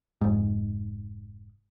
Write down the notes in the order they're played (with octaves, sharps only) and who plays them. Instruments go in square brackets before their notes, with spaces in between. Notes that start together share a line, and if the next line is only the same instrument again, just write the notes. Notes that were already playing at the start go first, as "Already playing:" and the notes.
[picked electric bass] F1 G#2